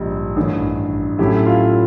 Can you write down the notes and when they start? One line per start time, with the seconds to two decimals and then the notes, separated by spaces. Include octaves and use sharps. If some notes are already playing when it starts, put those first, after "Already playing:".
Already playing: A#1 G#2 D#3 G3
0.36 A1 G2 D#3
1.19 A2 F#3 A3 C#4 E4 G4
1.46 F4